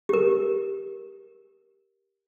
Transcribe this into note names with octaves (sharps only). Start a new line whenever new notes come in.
G4 A#4